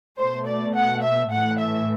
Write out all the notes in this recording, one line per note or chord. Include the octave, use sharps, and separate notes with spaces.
B2 A3 C5
D5
F#5
E5
A2 E3 A3 F#5
E5